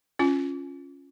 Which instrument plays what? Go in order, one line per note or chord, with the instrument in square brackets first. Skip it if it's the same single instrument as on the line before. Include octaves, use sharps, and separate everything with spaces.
[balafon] C#4 F4